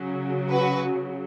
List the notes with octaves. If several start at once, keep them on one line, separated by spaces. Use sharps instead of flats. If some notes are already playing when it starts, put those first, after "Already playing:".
Already playing: C#3 F#3
F#4 B4